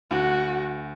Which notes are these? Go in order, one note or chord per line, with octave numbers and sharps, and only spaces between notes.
D2 F#4